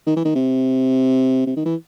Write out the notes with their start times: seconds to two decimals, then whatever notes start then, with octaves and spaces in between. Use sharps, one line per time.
0.06 D#3
0.16 E3
0.25 D#3
0.35 C3
1.46 C3
1.56 D#3
1.65 E3